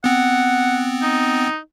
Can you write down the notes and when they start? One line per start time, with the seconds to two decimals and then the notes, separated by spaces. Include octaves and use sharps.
0.04 B3 C4 F#5
1.02 D#4